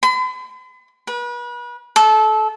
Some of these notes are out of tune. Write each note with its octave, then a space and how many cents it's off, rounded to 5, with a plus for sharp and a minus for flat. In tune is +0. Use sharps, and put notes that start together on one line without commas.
B5 +45
B4 -35
A4 -25